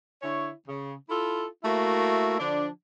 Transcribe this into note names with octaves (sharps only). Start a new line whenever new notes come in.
D3 E4 C#5
C#3
E4 F4 A4
A3 A#3 E4 F#4
D3 F3 D4